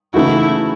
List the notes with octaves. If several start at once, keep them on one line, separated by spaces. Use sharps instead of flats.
C#3 E3 A3 D#4 E4 F#4